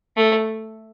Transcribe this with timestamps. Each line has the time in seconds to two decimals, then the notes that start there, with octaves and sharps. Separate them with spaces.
0.17 A3